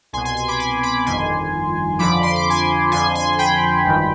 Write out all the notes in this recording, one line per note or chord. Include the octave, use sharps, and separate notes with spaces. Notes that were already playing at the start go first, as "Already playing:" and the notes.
C2 B2 G#5 C6
G#5 C6
G#5 C6
B5 D6
G#5 C6
B5 D6
G1 F2 D#3 G#5 C6
F2 D3 F3 B5 D6
C6
D6
G#5 C6
F2 D3 F3 G#5 C6
G#5 C6
G5 B5
G#1 G2 D#3